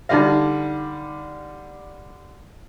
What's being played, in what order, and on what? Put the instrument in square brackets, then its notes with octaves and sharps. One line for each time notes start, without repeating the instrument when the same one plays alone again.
[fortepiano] D3 G3 F5 [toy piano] D#4 E5